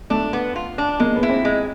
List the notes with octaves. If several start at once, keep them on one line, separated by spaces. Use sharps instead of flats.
A3 D4
B3
F4
D4
G#3 A#3
B3
E4
C4
G#3